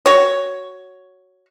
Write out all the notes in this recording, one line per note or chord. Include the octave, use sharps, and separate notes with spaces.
F#4 C#5